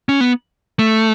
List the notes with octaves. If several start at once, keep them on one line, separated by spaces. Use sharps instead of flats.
C#4
B3
A3